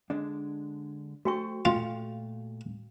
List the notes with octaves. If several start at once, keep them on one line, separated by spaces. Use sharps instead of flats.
D3 G#3 D4
A3 F#4 C5 G5 C#6
A#2 A3 F4 F5 G5